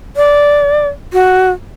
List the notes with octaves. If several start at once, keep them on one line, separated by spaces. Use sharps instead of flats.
D5
F#4